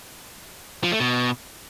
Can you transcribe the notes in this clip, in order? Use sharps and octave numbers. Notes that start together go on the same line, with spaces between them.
F3
A3
B2